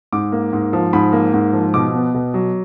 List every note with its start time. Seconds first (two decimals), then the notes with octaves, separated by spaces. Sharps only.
0.13 G#2 D6
0.32 A#3
0.53 G#2
0.73 F3
0.93 G#2 B5
1.13 A#3
1.34 G#2
1.53 F3
1.74 B2 D6
1.94 B3
2.14 B2
2.34 F#3